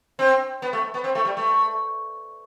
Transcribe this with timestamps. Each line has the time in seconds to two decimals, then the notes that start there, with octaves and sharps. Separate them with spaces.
0.19 C4
0.62 B3
0.73 A3
0.94 B3
1.04 C4
1.15 A3
1.25 G3
1.37 A3